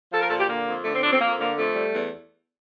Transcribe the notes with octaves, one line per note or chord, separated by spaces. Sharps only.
F3 A4
A#4
A#2 A4
G4
D3 A#3
F2
D3 A3
C4
F2 D4
C4
F2 A#3
D3 A#3
F2 A3
G3
E2